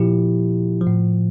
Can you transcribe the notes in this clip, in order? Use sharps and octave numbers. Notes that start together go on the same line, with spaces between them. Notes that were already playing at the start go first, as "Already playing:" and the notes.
Already playing: A#2 F3 E4 G4
F3
A2